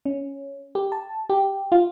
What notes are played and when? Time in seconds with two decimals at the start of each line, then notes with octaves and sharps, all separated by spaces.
0.05 C#4
0.75 G4
0.92 A5
1.30 G4
1.72 F4